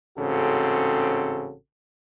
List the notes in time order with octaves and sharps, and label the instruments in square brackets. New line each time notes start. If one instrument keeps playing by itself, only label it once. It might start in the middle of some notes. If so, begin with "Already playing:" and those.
[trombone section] A1 G#2 C#3 C4 F#4 A4